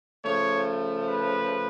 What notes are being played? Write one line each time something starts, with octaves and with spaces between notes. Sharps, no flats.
C#3 F3 A3 C#5
B4